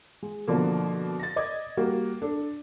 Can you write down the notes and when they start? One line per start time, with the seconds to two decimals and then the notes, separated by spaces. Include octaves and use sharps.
0.23 G#3
0.48 B2 D3 F3 A#3
1.19 A6 A#6
1.36 D5 D#5 D6 G#6
1.77 G3 A#3 F#4
2.22 D4 A4